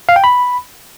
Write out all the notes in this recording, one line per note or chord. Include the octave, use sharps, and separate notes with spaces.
F5
G5
B5